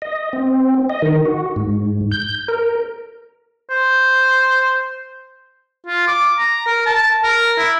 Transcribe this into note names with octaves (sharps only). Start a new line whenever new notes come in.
D#5
C4
D#5
D#3
F#4
G#2
G6
A#4
C5
F4
D6
A#5
A#4
A5
A#4
E4